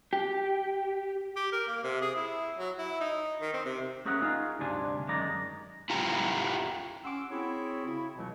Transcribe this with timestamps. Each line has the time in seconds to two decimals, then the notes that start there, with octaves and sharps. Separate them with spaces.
0.13 G4
1.36 G4
1.52 A#4
1.67 A#3
1.84 C3
2.01 G#4
2.16 E4
2.58 F#3
2.78 E4
3.01 D#4
3.41 D#3
3.53 C4
3.65 C3
4.05 A3 C#4 G#4 A#4 E5 F#5
4.22 D#4 F4 G#4 F5
4.59 D2 G2 C3 D4 G#5
5.08 F#2 D#3 G#3 D5 A#5
5.90 E4 F4 G4 A#5
7.04 C#4 F#5 C6 D6 E6
7.30 C4 E4 F#4 G#4 C#5
7.86 C#3 E4
8.15 C#2 B2 E3 F#3 A3